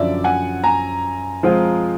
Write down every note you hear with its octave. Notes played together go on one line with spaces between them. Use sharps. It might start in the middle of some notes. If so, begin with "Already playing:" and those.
Already playing: F#2 D3 F3 D5 E5
F#5 G#5
G#5 A#5
F3 G#3 C4 F4